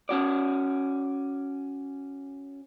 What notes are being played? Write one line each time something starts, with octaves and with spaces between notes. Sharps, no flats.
C#4 F#4 D5